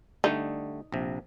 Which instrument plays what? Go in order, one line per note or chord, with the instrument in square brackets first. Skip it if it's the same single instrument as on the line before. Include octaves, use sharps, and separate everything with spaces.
[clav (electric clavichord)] D3 G3 A3 [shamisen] D#4
[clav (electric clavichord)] A#1 C3